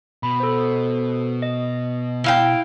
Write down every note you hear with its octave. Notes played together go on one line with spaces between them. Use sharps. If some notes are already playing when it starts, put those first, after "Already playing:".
B2 B5
A4 C5
D#5
E4 F5 G5